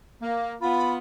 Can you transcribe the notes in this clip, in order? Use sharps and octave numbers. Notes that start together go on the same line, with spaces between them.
A#3
B3 F4 B5